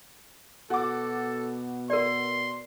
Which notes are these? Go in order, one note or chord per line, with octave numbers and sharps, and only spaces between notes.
B2 F#4 A4 D6
A#4 D5 C6